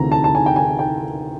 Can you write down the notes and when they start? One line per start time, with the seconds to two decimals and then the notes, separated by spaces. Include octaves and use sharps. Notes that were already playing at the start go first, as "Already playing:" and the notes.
Already playing: D2 C3 E3 A#5
0.12 A5
0.24 A5
0.35 G#5
0.46 G5
0.56 G#5
0.79 G5